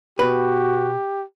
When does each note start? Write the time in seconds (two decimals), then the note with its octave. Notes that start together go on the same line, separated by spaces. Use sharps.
0.19 B2 F#4 G4 B4